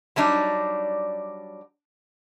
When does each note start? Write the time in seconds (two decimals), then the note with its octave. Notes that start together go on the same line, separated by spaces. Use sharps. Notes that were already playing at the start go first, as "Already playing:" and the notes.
0.16 F#3 G3 D4 D#4